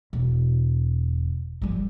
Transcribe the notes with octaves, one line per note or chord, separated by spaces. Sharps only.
E1
F3 G3